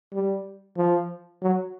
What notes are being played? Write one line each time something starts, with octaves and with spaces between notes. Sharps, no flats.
G3
F3
F#3